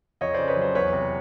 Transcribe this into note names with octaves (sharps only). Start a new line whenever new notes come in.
F2 C#5 D#5
C#3 C5 D5
B4 C#5
F#3 C5
E2 B4 C#5
C3